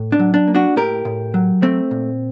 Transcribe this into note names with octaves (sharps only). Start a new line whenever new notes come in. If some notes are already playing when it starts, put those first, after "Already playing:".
Already playing: A2
D4
F#3
D4
A#3
D4 F#4
A2 G4 A#4
A2
F#3
A3 C4
A#2